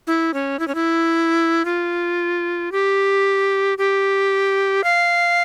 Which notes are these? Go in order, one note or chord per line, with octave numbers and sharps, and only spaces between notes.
E4
C#4
E4
C#4
E4
F4
G4
G4
F5